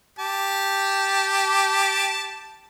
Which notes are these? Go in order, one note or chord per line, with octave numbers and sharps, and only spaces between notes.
G4 A5